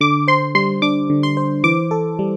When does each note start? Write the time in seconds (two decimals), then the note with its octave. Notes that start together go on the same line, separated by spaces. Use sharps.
0.01 D3 D6
0.28 C5 C6
0.55 G3 C6
0.82 D4 D6
1.10 D3
1.23 C6
1.37 C5
1.64 E3 D6
1.91 A4
2.19 G3